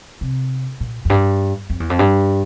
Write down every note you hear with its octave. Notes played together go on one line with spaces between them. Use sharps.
C3
A#2
F2
G2
F2
E2
F2
G2